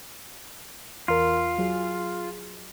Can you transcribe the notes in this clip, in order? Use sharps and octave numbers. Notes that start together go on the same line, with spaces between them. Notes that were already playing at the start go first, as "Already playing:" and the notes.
E2 F4 A#4
F#3 G#4